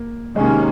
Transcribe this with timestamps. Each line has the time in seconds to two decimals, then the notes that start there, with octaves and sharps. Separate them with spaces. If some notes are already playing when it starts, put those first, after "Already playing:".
Already playing: A#3
0.35 C3 D#3 G#3 A#3 C#4